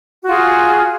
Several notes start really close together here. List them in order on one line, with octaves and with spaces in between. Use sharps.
F#4 F4 G#4